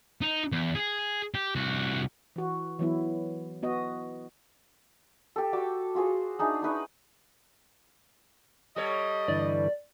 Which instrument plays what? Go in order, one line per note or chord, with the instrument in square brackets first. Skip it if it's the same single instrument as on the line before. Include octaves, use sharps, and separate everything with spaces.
[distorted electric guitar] D#4
E2
G#4
G4
C2 F#4
[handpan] E3 F#4
E3 F#3 B3 E4
B3 F#4 D#5
[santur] G4 A4
F#4 G5 D6
F4 F#4 G#4 C5
D4 D#4 G#4 E5
D#4 E4 B4 C#6
[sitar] G3 A4 C#5 [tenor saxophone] D#5
[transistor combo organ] G2 D3 E3 [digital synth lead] D5